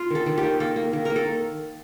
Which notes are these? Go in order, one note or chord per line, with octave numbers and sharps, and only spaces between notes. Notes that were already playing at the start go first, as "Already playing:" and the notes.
Already playing: F4
D#3 A4
D#3
G4
A#3
A#3 A4
A#3
D#3
A#3 A#4
A4